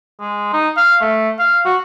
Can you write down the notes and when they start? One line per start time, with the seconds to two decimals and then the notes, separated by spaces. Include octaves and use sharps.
0.20 G#3
0.53 D#4
0.77 F5
1.01 A3
1.39 F5
1.65 F#4